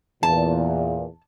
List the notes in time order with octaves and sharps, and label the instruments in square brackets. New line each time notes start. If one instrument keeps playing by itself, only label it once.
[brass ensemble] E2 A#2 [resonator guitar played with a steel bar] A5